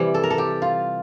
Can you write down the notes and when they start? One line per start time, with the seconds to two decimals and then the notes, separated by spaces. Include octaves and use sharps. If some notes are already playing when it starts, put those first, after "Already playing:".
Already playing: C3 E3 G3
0.14 A4
0.23 A#4
0.30 A4
0.38 G4
0.62 F4